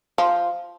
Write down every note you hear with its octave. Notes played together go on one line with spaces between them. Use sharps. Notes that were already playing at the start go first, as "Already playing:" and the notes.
F3